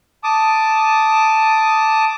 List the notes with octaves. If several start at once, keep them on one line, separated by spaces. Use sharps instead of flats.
A5 D6 D#6